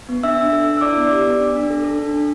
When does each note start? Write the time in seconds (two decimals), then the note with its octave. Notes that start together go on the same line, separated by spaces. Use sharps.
0.09 B3
0.23 D4 E5 E6
0.37 D4
0.52 A4
0.67 D4
0.77 E6
0.81 E4 D5 D6
0.97 B3
1.12 G4
1.25 B3
1.40 D4
1.56 D4
1.70 A4
1.84 A4
1.99 D4
2.14 D4